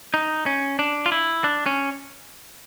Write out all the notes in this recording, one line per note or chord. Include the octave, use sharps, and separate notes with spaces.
D#4
C#4
D4
F4
E4
D4
C#4